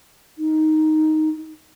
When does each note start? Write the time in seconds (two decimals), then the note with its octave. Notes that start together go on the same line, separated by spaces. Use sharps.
0.38 D#4